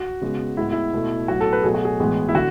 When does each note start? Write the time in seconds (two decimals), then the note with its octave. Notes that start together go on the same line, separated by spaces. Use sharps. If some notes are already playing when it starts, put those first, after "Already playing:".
Already playing: F#4
0.21 C#3 G#3 B3
0.57 A2 G#3 B3 E4
0.72 E4
0.93 B2 A3
1.28 A2 F#3 B3 F#4
1.40 A4
1.53 B4
1.63 B2 F#3 A3 G#4
1.74 F#4
1.85 G#4
2.00 A2 E3 G#3 B3
2.29 E4
2.34 D3 F#4